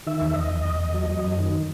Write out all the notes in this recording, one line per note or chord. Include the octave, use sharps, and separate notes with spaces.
D#3 E5
E2
E5
E2 D#5
E2
E2
E2
F#3
F#3
F#2
D#3